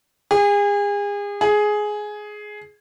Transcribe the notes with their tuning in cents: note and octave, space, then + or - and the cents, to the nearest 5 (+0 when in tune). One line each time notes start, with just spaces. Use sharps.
G#4 -35
G#4 +10